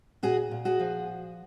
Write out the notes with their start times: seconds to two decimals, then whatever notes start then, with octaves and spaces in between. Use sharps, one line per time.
0.23 A#2 F#4 G#4
0.51 A#2
0.65 F#4 G#4
0.79 F3